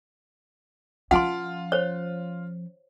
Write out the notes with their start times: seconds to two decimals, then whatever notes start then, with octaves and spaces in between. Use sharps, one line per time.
1.11 F3 C#4 F4 F#5 A5 C6
1.72 C5 C#5